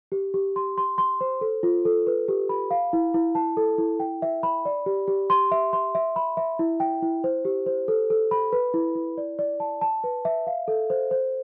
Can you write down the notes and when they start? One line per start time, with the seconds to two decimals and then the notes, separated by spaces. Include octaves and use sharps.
0.12 G4
0.34 G4
0.56 C6
0.78 C6
0.98 C6
1.21 C5
1.41 A4
1.63 F4
1.85 A4
2.07 B4
2.28 G4
2.49 B5
2.71 F5
2.93 E4
3.14 E4
3.35 A5
3.57 A4
3.78 E4
4.00 G5
4.22 E5
4.43 B5
4.65 D5
4.86 G4
5.08 G4
5.30 C6
5.52 E5
5.73 C6
5.95 E5
6.16 B5
6.37 E5
6.59 E4
6.80 G5
7.02 E4
7.24 C5
7.45 G4
7.66 C5
7.88 A4
8.10 A4
8.31 B5
8.53 B4
8.74 E4
8.95 E4
9.17 D5
9.39 D5
9.60 A5
9.81 A5
10.04 B4
10.25 E5
10.47 F5
10.68 A4
10.90 C5
11.11 C5